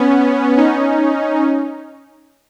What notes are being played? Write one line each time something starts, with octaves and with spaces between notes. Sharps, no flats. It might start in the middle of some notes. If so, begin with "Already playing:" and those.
Already playing: B3 C#4
C#4 D#4